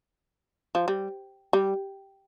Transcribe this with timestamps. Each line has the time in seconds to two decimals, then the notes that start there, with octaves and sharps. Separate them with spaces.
0.75 F3
0.88 G3
1.53 G3